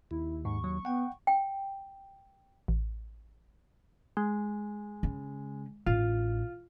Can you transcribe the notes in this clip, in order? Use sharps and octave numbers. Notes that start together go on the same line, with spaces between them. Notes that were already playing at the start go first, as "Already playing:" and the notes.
D#2 E4
G#2 C#6
F#3
B3 F#5 G5
G5
A1
G#3
C#3
A1 F4